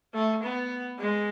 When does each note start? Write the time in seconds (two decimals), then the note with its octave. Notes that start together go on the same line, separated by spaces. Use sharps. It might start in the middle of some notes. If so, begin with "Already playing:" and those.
0.14 A3
0.43 B3
0.99 G#3